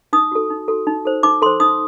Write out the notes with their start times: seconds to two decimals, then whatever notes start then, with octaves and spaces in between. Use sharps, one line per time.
0.13 D#4 D#6
0.32 F#4 A4
0.50 D#4
0.68 F#4 A4
0.87 D#4
1.05 A4 C5
1.23 D#4 D6
1.42 A4 C5 C6
1.60 D#4 D#6